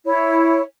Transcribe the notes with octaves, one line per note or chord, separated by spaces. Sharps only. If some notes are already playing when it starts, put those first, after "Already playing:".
E4 C#5